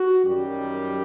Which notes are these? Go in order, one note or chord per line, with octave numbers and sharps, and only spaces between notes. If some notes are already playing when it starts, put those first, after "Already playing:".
Already playing: F#4
F#2 D#3 G3 G4